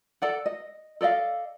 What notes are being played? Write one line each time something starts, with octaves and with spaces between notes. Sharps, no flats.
A4 D5 F#5
D#5
A4 D5 D#5 F5